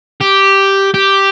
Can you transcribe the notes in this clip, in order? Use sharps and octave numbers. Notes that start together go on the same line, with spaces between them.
G4
G4